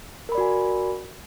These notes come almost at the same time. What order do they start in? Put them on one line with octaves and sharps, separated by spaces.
A#4 B5 D5 F#4 G#5